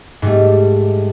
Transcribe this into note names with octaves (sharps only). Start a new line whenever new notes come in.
G#2 G3 A3